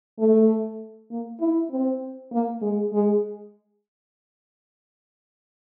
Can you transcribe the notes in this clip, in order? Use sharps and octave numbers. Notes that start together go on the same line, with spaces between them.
A3
A#3
E4
C4
A#3
G#3
G#3